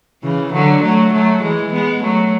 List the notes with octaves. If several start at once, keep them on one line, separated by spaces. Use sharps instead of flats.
C#3 E3
D3 F#3
F#3 A3
F#3 A3
E3 G#3
G#3 B3
F#3 A3